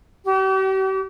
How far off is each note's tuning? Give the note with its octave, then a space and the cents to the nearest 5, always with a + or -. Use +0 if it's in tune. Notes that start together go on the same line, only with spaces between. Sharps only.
G4 -45